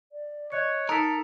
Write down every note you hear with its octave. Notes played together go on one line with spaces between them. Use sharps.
D5
C#5 D#5 F#6 C#7
D#4 A4 A#4 D#6 B6